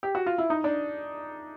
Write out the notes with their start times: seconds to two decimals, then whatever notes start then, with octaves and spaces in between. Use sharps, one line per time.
0.03 G4
0.15 F#4
0.26 F4
0.38 E4
0.50 D#4
0.64 D4